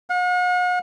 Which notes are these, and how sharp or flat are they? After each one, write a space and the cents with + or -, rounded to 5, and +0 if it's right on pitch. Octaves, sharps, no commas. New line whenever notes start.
F#5 -45